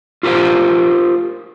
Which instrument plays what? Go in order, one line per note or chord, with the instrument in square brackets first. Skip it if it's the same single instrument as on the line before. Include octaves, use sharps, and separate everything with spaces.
[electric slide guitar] F4 G4 A#4 C5 F5